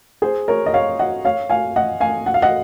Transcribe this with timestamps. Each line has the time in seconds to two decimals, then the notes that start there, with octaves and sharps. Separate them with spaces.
0.22 G#4 C5
0.48 A#4 C#5
0.66 D#5
0.74 C#5 F5
0.99 D#5 F#5
1.25 C#5 F5
1.49 F5 G#5
1.76 D#5 F#5
2.01 F5 G#5
2.26 F#5
2.34 F5
2.42 D#5 F#5